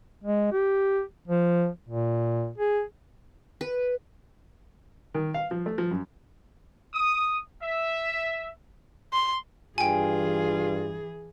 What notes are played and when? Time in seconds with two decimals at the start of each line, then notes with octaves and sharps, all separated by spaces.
0.24 G#3
0.52 G4
1.28 F3
1.89 A#2
2.58 G#4
3.61 B4
5.14 D#3
5.34 F5
5.51 F3
5.66 A3
5.78 F3
5.91 F#2
6.94 D#6
7.62 E5
9.13 C6
9.78 G2 E3 F4 G#4 G5 G#5